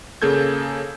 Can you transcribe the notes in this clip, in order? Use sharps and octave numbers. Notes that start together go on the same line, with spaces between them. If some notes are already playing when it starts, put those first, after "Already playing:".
C#3 A#3 G#4 A4 G6 G#6